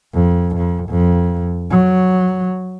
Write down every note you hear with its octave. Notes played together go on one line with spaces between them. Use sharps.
F2
F2
F2
F#3